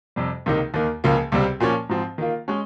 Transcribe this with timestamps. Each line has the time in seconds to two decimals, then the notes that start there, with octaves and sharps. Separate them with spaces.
0.16 F2 C3 G3
0.46 C#2 C3 D#3 A#3 D#4
0.74 D#2 D#3 A#3
1.04 C#2 C#3 F3 A#3
1.32 C#2 C3 G3 C4
1.60 A#2 F3 A#3 C#4
1.89 G#2 F3 C4
2.18 D#3 A#3 F4
2.48 G#3 C#4